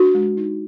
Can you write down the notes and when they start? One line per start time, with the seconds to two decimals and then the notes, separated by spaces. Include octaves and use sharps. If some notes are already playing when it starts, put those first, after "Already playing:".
Already playing: D4 F#4
0.14 G#3
0.37 D#4